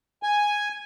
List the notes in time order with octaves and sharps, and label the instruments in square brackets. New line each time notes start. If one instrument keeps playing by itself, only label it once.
[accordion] G#5